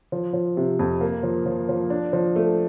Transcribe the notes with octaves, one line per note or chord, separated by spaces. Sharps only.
F3
F3
C3
F2
A#3
F3
F3
F3
D4
F3
A3